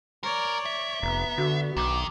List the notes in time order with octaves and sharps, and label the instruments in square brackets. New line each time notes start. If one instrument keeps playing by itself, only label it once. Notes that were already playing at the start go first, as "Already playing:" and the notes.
[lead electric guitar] A#4 [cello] C#5 D5
[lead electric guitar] E5
[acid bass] F1 [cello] B3 [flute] A#5
[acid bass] D3 [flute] F#4
[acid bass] B1 [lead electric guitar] D#3 [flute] D6